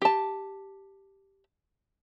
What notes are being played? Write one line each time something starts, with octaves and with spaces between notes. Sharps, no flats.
G4 A5